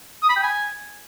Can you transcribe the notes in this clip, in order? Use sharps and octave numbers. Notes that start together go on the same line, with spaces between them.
D#6
B5
G5
G#5